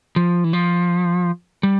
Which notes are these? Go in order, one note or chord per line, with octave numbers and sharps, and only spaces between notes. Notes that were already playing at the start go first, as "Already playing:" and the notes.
F3
E3
F3
G3